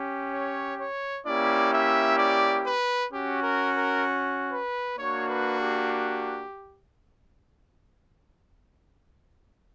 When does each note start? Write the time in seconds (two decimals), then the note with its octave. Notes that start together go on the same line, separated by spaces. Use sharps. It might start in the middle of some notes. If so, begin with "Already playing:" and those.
Already playing: C#4 G4
0.33 C#5
0.79 C#5
1.25 A#3 C#4 E4 G4 D5
1.72 E5
2.18 D5
2.65 B4
3.11 C#4 F#4 G4
3.43 A#4
3.73 A#4
4.51 B4
4.97 A#3 D4 F#4 C#5
5.28 B4
5.59 G4